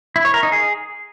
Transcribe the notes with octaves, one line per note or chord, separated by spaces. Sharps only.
E4
C#5
A#4
D#4
G#4